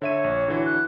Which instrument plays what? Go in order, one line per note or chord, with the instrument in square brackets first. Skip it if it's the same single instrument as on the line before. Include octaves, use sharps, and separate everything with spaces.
[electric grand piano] D3 E5 D#7 [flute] C#5
[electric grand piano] A#1
D3 E3 F#4
[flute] F#6